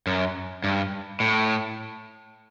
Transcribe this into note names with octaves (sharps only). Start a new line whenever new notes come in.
F#2
G2
A2